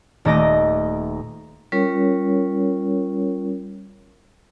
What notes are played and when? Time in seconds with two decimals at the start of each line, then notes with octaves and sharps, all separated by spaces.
0.25 D#1 A3 D#4 D#5 D6 A#6
1.72 G3 C#4 F4 A#4 C#5